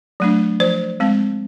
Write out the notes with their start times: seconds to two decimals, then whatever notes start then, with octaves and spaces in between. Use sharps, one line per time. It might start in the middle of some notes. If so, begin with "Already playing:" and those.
0.20 F#3 A3 D4
0.60 F3 C5
1.00 G#3 C4